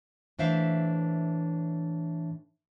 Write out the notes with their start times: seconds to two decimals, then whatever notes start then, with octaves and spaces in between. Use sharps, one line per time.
0.39 A2 E3 D4 C5 E5 F5